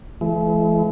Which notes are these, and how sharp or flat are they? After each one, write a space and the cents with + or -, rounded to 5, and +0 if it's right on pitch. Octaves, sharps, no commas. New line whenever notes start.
E3 +35 A3 -45